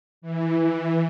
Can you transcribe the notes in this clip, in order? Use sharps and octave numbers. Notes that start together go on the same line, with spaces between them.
E3
E3